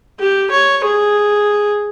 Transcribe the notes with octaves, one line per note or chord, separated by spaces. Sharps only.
G4
C#5
G#4